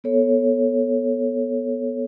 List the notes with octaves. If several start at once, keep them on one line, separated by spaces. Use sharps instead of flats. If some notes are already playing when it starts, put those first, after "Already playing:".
B3 A4 C#5